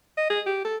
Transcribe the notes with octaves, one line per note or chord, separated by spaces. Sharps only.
D#5
G#4
G4
A4